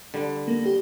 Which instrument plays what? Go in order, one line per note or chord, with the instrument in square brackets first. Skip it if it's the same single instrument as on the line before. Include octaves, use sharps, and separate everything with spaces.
[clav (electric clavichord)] D3 G3
[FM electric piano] A#3
G4